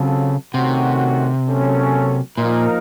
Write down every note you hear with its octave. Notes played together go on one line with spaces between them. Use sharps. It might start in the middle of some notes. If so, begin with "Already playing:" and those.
Already playing: C#3 F#3 C4 F4 A4
C3 D#3 A3 C#4 F#4
F#3 A#3 C#4 A4
A#2 F3 A#3 D#4 A#4